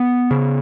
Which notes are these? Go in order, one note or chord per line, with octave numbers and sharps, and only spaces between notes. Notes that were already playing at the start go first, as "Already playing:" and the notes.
Already playing: B3
C#3